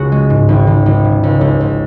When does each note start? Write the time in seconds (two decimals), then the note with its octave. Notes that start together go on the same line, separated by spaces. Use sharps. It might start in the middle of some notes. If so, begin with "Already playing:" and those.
Already playing: C#2 C#3 F#4 G#4
0.12 G#3
0.30 G#2
0.49 G#1
0.67 G#1
0.86 G#1
1.04 C#3
1.23 C#2
1.41 C#2
1.60 C#2